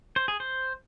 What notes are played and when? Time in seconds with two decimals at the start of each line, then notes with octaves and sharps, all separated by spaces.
0.16 C5
0.28 G#4
0.40 C5